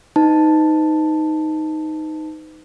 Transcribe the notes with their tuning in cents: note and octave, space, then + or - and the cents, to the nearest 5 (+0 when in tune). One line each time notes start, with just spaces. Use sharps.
D#4 +0 B4 +45 A5 +0